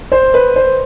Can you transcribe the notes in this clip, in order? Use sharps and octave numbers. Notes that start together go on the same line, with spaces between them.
C5
B4
C5